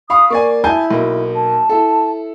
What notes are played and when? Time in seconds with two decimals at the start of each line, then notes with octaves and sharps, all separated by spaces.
0.10 F5 B5 C#6 D#6
0.30 A#3 D5 G#5 C#6
0.64 E4 G#5 A5 G6
0.90 B1 A#3
1.34 A5
1.69 E4 A4